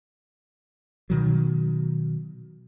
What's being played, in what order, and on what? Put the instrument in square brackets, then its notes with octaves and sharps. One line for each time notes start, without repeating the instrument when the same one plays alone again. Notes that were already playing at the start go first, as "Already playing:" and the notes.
[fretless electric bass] B2 D#3 F#3